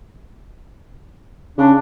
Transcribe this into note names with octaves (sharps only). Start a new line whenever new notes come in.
C#3 D4